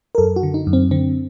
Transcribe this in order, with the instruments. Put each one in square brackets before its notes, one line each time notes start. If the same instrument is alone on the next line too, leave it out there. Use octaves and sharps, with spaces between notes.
[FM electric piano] A#4
F#2 A4
F#4
D3
D#4
F#2
C4
D3 C4